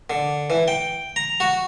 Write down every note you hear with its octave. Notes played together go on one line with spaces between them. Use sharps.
D3
E3
G5
A#5
F#4